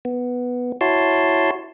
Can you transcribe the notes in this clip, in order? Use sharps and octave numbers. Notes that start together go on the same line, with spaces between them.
B3
E4 F#4 C#5 A5 C6